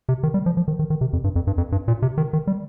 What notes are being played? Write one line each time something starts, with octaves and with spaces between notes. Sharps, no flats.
C3
D#3
G3
F3
F3
D#3
D#3
D#3
C3
F2
G2
F2
G2
F2
G2
A#2
C3
D#3
D#3
G3